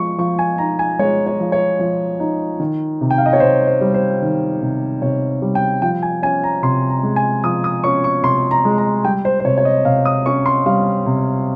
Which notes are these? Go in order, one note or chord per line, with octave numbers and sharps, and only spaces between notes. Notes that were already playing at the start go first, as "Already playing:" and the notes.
Already playing: F3 G#3 C#6
F3 C#6
G#5
D#4 A#5
G#5
G#3 C#5
C#5
F3
C#5
F3
D#4
D#3
C3
G5
F5
D#5
C#5
C3 C5
C5
G3
C5
D#3
C3
C3 C#5
G3
G5
F3 G5
G#5
C#4 G#5
A#5
C3 C6
A#5
G#3
G#5
F3 D#6
D#6
C#4 C#6
C#6
C3 C6
A#5
G#3
A#5
G3 G5
C5
C5
C3 C#5
C#5
D#5
C3 F5
D#6
C#4 C#6
C6
G3 F5
C3